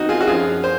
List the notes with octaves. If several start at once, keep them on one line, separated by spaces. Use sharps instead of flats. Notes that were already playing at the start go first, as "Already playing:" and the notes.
Already playing: F2 D#4 F#4
F4 G#4
F#4
F#2 F3 F4 G#4
C5